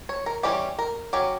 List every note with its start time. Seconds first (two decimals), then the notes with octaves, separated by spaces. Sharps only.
0.09 C#5
0.26 A#4
0.43 E3 G3 C#4 G4
0.79 A#4
1.13 F#3 C#4 G4